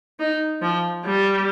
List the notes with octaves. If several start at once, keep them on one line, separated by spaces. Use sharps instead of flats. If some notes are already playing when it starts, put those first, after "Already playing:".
D#4
F3
G3